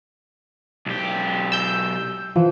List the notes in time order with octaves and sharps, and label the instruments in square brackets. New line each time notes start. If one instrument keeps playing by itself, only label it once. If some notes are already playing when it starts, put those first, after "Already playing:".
[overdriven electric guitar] B1 G4
[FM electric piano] E6 G6
[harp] E3 [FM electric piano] F3